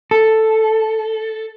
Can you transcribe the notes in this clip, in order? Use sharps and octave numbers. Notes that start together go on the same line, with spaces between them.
A4